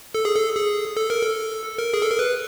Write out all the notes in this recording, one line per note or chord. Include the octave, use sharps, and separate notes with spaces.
A4
G#4
A4
G#4
A4
A#4
A4
A#4
G#4
A4
A#4
B4